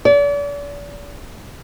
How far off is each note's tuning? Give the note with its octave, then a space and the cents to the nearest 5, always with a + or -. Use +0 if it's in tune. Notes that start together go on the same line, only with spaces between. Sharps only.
D5 -40